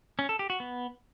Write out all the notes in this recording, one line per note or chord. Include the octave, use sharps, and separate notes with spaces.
C#4
A4
G4
F#4
B3